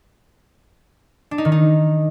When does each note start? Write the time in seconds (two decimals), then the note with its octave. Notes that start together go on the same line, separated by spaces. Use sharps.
1.31 D4
1.38 D#4
1.45 D#3
1.52 D#4